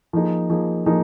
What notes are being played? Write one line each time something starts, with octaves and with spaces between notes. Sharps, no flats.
F3 A#3 D#4 G#4
F3 A#3 D#4 G#4
F3 A#3 D#4 G#4